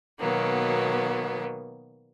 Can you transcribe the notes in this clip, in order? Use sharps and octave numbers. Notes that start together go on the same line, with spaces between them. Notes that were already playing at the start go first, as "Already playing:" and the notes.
B2 D#3 F#3 A#3 B3